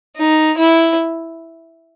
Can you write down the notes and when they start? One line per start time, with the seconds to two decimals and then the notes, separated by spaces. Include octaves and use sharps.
0.17 D#4
0.57 E4